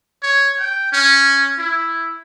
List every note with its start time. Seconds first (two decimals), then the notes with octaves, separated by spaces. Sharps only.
0.23 C#5
0.59 G5
0.92 C#4
1.59 E4